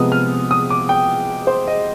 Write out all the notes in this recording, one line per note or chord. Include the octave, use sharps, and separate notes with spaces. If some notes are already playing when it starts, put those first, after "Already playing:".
Already playing: C3 F3 G#3 B3 D#6
F6
D#6
D6
G5
C5
D#5